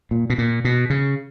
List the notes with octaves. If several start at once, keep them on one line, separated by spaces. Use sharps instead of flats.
A#2
B2
A#2
B2
C#3